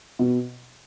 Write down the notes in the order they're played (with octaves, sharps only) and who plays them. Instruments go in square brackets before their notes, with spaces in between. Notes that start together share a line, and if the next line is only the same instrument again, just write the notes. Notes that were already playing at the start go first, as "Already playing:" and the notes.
[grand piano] B2